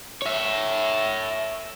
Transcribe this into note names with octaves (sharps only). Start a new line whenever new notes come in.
C#5 E5